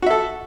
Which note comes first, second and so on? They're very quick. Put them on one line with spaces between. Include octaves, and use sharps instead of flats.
F#4 E5 A4